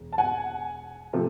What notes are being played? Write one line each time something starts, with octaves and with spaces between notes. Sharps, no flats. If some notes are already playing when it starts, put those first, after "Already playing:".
Already playing: E1
A5
F#5 G#5
C3 F3 A3